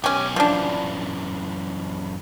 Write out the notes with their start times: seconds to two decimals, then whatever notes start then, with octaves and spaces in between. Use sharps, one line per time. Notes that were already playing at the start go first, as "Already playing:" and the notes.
0.04 B1 C#4 G4 G#5
0.36 F#2 E3 F3 D4